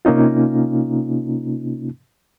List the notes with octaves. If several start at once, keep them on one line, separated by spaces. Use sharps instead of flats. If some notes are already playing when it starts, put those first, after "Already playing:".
C3 A#3 C#4 D#4 F4